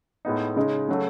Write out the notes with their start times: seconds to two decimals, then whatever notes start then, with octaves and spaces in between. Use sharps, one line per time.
0.25 A2 G#3 B3 D#4
0.56 C#3 G#3 D#4
0.88 C#3 F#3 A3